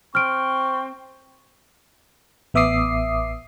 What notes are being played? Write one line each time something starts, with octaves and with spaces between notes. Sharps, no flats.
C4 C#6 F6 D7
A1 B3 E5 D6 D#6 C7